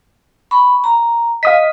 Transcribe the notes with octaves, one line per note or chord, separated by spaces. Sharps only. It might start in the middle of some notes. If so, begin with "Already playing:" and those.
B5 C#6
A#5
D#5 F5 D#6 B6